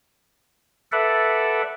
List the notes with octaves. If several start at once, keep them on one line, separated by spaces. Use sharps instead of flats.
A4 B4 D5 E5 F#5